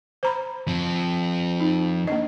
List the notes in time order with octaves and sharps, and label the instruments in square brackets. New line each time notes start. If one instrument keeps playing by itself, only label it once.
[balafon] C5 A#5 B5
[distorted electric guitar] F3 C4
[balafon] D#4
A#3 D4 D#5